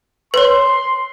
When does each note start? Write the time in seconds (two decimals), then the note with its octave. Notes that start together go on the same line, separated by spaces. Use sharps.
0.34 B4 C#5 C6